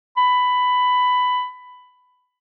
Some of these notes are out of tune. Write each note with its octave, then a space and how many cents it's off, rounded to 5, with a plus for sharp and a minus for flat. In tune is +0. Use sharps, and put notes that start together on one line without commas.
B5 +10